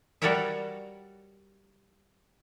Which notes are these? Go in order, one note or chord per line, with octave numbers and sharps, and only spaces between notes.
G3 F#4 A4 A#4 C#5 E5